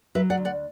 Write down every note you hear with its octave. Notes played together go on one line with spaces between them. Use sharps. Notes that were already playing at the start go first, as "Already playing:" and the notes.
F#3 B4 E5
D5 F#5
D2
D5 F#5